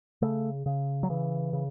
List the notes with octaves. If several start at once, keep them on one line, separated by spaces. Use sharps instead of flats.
C#3 A3
C#3
F#3
C#3 E3
C#3